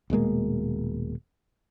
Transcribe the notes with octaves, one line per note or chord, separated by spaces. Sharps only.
D#1 B2 G#3 A#3